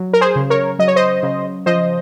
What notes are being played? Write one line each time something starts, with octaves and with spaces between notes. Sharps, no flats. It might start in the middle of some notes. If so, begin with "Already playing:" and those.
Already playing: F#3
A#4
G#4 C5
C#3
A#4 C#5
F#3 D#5
C#5
C5 D#5
C#3
F3 C5 D#5